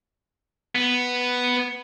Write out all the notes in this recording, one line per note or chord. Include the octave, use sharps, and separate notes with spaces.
B3